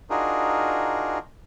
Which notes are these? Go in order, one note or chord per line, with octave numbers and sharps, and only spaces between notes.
D4 D#4 F4 F#4 G#4 A#4